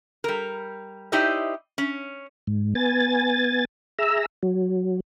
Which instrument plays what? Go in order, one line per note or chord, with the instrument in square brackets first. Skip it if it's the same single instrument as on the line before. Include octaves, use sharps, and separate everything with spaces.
[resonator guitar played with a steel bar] G3 A#4
D#4 E4 G4 C5 D5 D#5
C#4
[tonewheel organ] G#2
B3 G#5 A6
G#4 E5 A#5 E6
F#3